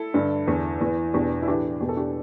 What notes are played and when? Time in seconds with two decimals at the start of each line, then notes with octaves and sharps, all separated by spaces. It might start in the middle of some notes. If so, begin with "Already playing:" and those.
Already playing: E4 A4
0.14 G2 D3
0.48 E2 D3
0.81 E2 E3
1.14 E2 B2 D4 G4
1.42 E4
1.47 A2 E3 D4 G4
1.80 E2 B2 G4
1.89 A4
1.97 D4 G4